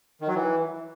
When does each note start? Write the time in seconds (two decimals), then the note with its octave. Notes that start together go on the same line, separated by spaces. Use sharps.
0.21 D#3
0.28 F#3
0.34 E3